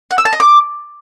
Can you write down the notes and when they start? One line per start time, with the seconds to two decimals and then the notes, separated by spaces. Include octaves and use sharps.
0.11 F#5
0.18 E6
0.25 A5
0.33 D#5
0.40 D6